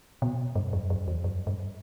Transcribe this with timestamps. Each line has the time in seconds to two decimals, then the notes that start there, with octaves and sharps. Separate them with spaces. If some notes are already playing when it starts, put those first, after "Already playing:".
0.22 B2
0.56 G2
0.73 F#2
0.90 F#2
1.08 E2
1.24 F#2
1.47 G2